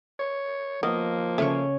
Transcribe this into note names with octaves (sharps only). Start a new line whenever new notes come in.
C#5
F3 A#3 B3 D#5
C#3 A3 C#4 C#5